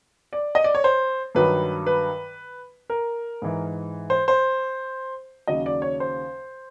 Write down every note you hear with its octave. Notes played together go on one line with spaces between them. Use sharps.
D5
D#5
D5
C#5
C5
G2 D#3 F#3 B4
B4
A#4
G#2 E3
C5
C5
D#2 C#3 F#3 D#5
D5
C#5
C5